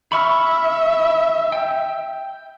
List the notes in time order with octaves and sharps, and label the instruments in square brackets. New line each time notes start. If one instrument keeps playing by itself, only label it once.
[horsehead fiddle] E5 [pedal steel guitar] B5 C#6 F6
[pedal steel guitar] G5